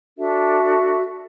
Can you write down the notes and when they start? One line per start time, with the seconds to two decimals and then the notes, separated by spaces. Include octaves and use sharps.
0.18 D4 F#4 A4 E5